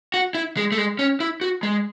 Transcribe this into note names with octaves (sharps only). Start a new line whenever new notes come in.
F#4
E4
G#3
A3
G#3
C#4
E4
F#4
G#3